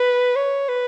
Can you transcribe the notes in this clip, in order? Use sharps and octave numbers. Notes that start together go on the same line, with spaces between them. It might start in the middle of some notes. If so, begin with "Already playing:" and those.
Already playing: B4
C#5
B4